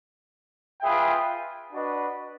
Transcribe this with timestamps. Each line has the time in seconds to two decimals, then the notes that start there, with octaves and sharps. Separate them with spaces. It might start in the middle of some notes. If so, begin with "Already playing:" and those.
0.81 F4 G#4 B4 E5 G5
1.73 D4 F#4 B4 D#5